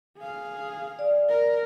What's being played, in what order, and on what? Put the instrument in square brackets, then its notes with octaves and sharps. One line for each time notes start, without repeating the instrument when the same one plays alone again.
[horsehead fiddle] G#4 F5
[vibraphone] D5
[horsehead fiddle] A#4